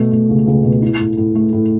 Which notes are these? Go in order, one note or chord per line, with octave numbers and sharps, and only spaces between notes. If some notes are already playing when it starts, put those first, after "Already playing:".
Already playing: B2 A3
A3
C#2
C#2
B2
E4
A2
A2
A3
A2